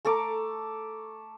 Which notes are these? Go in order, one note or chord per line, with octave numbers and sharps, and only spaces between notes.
A3 A4 A#5 D6